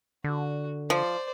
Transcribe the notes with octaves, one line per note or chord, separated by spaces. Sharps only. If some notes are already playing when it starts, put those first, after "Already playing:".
D3 F#4
F3 C5 D5